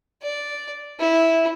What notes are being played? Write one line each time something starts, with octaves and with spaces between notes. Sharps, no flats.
D5
E4